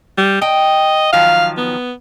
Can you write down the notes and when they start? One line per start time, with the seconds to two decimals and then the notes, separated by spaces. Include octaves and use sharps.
0.18 G3
0.42 D#5 G5
1.13 D#3 F3 F#3 F5
1.58 B3